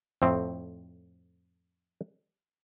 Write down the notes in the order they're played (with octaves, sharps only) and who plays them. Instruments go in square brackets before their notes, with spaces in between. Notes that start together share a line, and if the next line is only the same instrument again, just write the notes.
[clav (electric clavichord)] F2 A2 C4